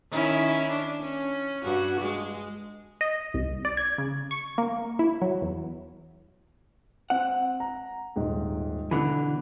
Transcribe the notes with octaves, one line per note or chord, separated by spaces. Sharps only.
D#3 C#4 E4
D4
C#4
G2 F#4
G#3
D#5
C2
D5
G#6
C#3
C#6
A#3
E4
F#3
E2
C4 F#5
A#5
D#1 G#2
B2 D3 E3 B5 F#6